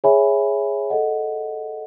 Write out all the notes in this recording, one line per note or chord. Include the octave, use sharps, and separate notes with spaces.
G#4 C#5 E5 G#5 B5
A4 D#5 F#5